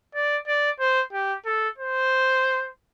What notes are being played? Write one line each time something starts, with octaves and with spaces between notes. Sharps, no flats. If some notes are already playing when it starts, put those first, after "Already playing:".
D5
D5
C5
G4
A4
C5